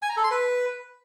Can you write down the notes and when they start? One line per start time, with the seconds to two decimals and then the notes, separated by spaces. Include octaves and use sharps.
0.02 G#5
0.09 A#5
0.17 A4
0.24 C6
0.31 B4